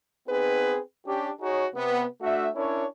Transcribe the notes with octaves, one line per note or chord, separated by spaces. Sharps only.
B3 C4 D#4 G#4 B4
C#4 D4 G4
D#4 F#4 G#4 C#5
C3 B3
A3 D4 F#4 E5
C#4 D4 E4 A#4 C#5